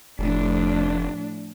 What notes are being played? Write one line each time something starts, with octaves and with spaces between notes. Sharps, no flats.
F1 A2 F3 D4